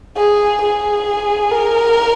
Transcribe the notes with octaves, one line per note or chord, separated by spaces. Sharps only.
G#4
G#4
A#4